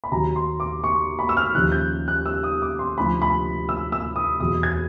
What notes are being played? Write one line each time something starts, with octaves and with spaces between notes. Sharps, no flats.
B5
D#2 D#3 F#3 A#5
C6
D6
C#6
B5
E6
F6
D#2 C#3 F3 F#6
G6
F#6
E6
D#6
D6
C6
D2 C3 F3 B5
B5
E6
E6
D#6
E2 B2 F#3 D#6
G#6